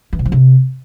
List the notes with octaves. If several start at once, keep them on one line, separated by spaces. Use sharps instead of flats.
E3
B2
F3
C3